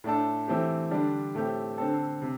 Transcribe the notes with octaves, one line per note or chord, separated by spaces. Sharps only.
A2 A3 D4 A4
E3 A3 C4 G4
D3 G3 D4
A2 A3 C4 G4
D3 C4 A4
C3